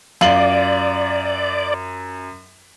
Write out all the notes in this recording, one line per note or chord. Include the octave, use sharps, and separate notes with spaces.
F#2 F4 D5 F#7